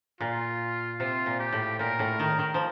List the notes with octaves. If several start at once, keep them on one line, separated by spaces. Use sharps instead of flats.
A#2 F4
C3 F4
A#2
G4
A2
A#2 A#4
A2
D#3
D#3
F3